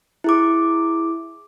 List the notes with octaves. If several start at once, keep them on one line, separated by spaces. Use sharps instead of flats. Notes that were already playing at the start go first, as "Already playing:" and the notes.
E4 G#4 D6